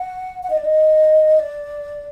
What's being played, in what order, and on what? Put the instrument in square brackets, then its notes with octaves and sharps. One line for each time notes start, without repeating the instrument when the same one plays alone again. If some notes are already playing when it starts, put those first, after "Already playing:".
Already playing: [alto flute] F#5
F#5
D#5
D5
D#5
D5